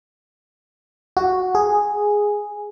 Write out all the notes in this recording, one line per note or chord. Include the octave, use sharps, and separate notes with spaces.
F#4
G#4